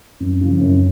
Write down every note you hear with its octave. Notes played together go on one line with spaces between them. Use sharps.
F#2
C#3 F3
F#2